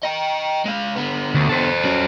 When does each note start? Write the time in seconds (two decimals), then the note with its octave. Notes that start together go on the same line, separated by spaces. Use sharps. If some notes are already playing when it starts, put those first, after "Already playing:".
0.04 D#5 G5
0.66 G#3 F5
0.96 D3 B3
1.35 D2
1.49 A4 C5
1.85 F#3 C#4